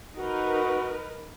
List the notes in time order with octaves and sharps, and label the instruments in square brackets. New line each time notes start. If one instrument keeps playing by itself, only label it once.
[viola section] D#4 A#4 B4 [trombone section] F#4